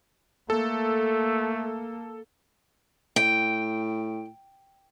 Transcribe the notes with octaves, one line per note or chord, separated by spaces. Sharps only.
A3 A#3 A4
A2 G5